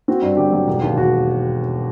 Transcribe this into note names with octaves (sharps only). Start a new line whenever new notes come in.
C4 F#4
G2
G1 G4
F#3
E1
D#2
E1 F#4